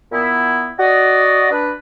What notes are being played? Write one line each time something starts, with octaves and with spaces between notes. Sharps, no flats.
A#2 B3 E4
F#4 D5 D#5
D4 B4